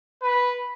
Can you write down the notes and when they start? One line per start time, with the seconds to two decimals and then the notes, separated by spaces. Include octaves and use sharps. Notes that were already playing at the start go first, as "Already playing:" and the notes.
0.22 B4